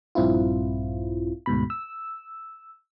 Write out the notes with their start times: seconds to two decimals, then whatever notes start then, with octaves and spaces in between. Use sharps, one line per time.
0.15 A#1 G2 C4 E4 F4
1.46 D2 G#2 B2 B5
1.70 E6